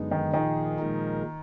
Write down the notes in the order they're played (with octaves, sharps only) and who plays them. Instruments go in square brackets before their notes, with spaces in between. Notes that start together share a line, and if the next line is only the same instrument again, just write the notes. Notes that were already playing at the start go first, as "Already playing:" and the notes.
Already playing: [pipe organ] F#2 D3 G#3 B3 D#4
[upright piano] D#3
[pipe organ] A#2 F3 A#3 D#4 G#4 [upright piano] D#3
[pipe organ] A#2 F3 G#3 D#4 A#4